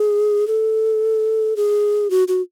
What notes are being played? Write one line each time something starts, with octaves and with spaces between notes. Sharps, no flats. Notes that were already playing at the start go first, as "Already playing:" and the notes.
Already playing: G#4
A4
G#4
F#4
F#4